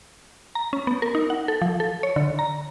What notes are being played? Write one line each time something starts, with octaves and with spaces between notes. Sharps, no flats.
A#5
C#4
B3
A#4
D#4
F#5
A4
F3
A4
C#5
D3
A#5